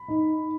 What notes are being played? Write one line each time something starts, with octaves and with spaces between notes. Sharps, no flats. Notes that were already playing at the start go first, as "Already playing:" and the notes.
Already playing: B5
D#4